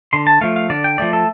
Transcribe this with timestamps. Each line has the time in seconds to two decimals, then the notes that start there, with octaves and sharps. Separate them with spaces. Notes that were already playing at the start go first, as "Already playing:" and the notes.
0.13 D3 C6
0.27 A5
0.41 F3 A3 F5
0.56 F5
0.70 D3 D5
0.84 G5
0.98 F3 A3 D5
1.13 A4